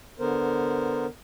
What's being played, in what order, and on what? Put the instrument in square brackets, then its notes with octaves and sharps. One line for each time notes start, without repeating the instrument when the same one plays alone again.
[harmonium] D3 B3 A#4 C5